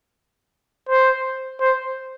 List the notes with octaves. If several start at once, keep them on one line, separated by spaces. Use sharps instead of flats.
C5
C5